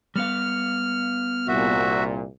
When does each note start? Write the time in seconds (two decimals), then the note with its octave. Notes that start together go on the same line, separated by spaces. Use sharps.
0.16 G3 B3 F5 F6
1.48 C2 A#2 F#4 E5